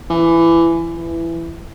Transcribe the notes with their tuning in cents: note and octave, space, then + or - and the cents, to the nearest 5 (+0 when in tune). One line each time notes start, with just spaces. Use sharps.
E3 +20
E3 +15